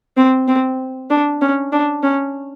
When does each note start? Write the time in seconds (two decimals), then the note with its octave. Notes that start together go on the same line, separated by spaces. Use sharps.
0.17 C4
0.48 C4
1.10 D4
1.41 C#4
1.72 D4
2.03 C#4